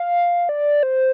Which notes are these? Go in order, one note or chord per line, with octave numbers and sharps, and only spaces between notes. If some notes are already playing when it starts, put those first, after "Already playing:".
Already playing: F5
D5
C5